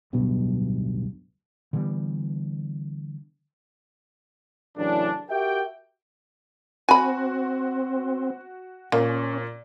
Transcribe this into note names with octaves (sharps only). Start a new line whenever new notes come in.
D1 B1 G2 B2
D3 E3 G3 B3
A2 C#3 E3 F#3 D4
F#4 G4 A#4 E5 G5
C4 F#4 G#5 B5
A#2 A#3 C#4